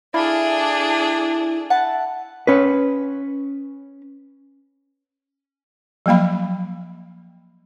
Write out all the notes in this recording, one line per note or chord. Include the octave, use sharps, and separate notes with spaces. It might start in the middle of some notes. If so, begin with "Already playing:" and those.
D4 E4 F4 G#4 A4 D5
E4 F#5 A5
C#4 B4
F3 F#3 A#3 F5 B5